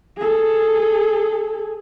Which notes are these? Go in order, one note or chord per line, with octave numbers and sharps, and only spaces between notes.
G#4 A4